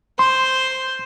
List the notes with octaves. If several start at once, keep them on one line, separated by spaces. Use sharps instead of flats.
C5 C6